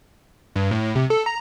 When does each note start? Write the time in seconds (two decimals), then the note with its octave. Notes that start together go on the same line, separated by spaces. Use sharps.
0.56 G2
0.71 A2
0.95 C3
1.10 A4
1.26 A#5